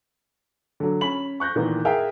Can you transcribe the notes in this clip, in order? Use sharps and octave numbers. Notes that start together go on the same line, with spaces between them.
D3 F#3
C#4 B5 B6 F#7
C#6 F#6 G6 A#6
A#2 D#3 E3 A#3 B3
G#4 A#4 E5 F5 G5 G#5